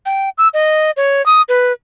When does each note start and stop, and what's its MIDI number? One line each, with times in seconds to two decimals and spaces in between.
0.06 0.29 79
0.38 0.48 88
0.54 0.91 75
0.97 1.24 73
1.26 1.42 87
1.49 1.72 71